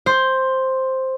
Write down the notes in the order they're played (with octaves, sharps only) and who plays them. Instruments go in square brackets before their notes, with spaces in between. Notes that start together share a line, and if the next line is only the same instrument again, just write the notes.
[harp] C5